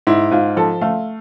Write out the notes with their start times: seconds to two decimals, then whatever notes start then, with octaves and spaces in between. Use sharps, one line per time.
0.07 G#2 E4
0.31 G#2 F4
0.57 F3 A4
0.81 A3 F5